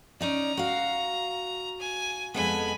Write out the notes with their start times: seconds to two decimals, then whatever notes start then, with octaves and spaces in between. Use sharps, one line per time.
0.21 C#4 D#4 D5 A#5
0.57 F#4 F5
1.80 G#5
2.34 F2 G#3 B3 G#5 B5